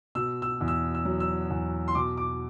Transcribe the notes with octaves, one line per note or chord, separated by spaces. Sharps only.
B2 E6
E6
E2
E6
E6
F#3
E6
E2
C6
B2 D6
D6